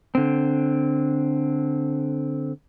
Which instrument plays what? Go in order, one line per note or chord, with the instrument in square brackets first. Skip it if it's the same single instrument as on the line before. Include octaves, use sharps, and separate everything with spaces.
[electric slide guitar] D3 C4